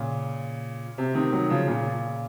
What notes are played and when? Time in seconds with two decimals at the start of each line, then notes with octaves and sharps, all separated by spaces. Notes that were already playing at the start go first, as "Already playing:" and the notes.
Already playing: A#2 C#3
0.98 C3
1.15 C3 D#3
1.33 D#3 F#3
1.50 C#3 F3
1.68 A#2 C#3